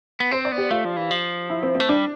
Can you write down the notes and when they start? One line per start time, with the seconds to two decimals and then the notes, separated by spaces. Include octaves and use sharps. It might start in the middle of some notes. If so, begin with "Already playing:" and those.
0.20 B3
0.31 C4 C5
0.45 D5
0.52 B3
0.58 G4
0.71 A3 F4
0.85 F3
0.97 E3
1.11 F3
1.50 E4
1.63 C4
1.75 C4
1.80 A3
1.89 G3 D4